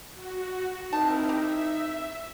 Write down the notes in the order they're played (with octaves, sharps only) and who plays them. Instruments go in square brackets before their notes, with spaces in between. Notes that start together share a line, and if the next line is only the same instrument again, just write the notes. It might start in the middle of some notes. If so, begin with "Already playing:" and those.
[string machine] F#4
[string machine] C4 E4 A#4 [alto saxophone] D#4 [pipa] A5
[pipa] G4 [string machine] E5